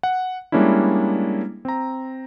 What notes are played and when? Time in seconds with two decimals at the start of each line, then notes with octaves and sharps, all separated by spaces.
0.03 F#5
0.52 G3 G#3 A#3 C#4 D4 E4
1.65 C4 A#5